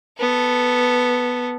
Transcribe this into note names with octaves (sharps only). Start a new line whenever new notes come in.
B3 A4